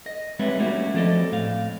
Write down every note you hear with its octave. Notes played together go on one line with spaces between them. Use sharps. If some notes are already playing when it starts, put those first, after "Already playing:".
D#5
G3 G#3 C4 B4 C#5 E5
G3 A3 A#3 C#4 E4 F#4
F3 C4 A4 D5 D#5
A2 F5